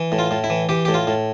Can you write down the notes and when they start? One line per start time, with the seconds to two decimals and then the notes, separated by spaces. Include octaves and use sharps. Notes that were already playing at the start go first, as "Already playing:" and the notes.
Already playing: E3
0.12 A2
0.19 F4
0.31 A2
0.44 E4
0.50 E3
0.69 E3 G4
0.85 A2 G4
0.94 F4
1.07 A2